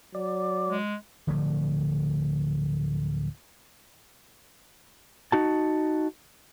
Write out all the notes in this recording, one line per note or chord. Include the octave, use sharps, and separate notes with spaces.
F#3 D5
G#3
D1 D3 F3 A3
D#4 F#4 A5